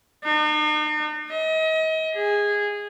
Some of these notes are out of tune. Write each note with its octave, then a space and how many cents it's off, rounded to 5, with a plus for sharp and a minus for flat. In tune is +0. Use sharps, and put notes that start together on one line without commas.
D#4 -45
D#5 +35
G#4 -15